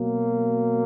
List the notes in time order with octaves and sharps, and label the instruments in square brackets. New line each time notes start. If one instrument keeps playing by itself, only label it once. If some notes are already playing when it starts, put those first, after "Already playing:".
Already playing: [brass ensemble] B2 F#3 A#3